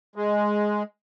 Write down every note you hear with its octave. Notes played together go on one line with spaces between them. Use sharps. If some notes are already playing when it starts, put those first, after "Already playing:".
G#3